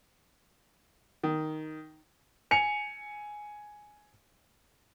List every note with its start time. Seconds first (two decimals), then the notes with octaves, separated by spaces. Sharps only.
1.24 D#3
2.51 G#5 C#7 F7